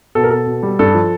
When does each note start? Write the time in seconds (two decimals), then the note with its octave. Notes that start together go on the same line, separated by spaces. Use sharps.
0.15 B2 A4
0.24 A#4
0.31 B2 A4
0.46 B2
0.63 G3
0.79 G2 A4
0.94 F3